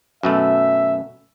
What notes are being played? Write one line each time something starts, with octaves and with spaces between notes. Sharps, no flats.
F#2 B2 A3 E5